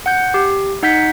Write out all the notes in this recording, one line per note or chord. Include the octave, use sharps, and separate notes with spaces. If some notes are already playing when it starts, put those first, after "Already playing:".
F#5 G6
G4
D#4 F#5 G6 B6